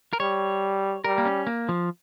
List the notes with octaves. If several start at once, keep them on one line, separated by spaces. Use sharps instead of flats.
A#4
G3 C#5
G3 A#4
A#3
C#4
A#3
F3